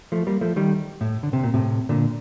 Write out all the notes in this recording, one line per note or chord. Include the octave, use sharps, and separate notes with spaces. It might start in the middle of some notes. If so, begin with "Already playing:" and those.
F3 A3
G3 A#3
F3 A3
D#3 G3
A2
D3
C3
A#2
A2 C3
A#2 D3